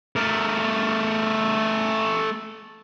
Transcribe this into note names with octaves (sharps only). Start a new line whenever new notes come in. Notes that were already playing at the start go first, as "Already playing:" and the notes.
A3 A#4